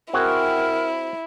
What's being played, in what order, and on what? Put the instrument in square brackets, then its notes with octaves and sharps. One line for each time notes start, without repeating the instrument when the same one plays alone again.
[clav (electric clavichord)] C4 F#4 G#4 [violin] E4 [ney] A#4